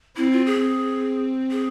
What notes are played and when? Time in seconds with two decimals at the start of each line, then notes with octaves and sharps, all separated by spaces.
0.17 C4 E4
0.32 F4
0.46 G#4
0.62 C4
1.51 G#4